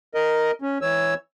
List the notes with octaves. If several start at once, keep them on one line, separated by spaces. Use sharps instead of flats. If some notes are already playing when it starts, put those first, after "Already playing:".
A#4 D#5
C#4
E3 C#5 E6